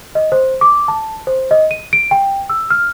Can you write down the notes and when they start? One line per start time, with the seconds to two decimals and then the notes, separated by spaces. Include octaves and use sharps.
0.15 D#5
0.32 C5
0.61 D6
0.88 A5
1.27 C5
1.51 D#5
1.71 D#7
1.93 D7
2.11 G5
2.50 E6
2.70 F6